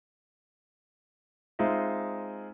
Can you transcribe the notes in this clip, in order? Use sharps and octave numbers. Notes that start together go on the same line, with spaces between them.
G#3 C4 D#4 F4 E5